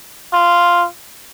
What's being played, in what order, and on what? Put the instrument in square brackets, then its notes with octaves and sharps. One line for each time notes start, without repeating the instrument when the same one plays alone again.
[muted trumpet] F4